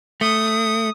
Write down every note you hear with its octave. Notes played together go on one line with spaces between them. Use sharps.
A3 D#6